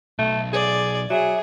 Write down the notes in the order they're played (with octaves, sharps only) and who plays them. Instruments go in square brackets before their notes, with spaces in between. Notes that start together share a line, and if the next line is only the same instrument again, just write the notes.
[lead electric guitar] B1 [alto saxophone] A3
[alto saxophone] G#4 [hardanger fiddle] D5
[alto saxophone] F#3 [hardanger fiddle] G#4 [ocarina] E5